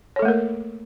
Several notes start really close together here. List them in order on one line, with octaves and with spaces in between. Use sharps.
C#5 A4 A3 A#3 A#4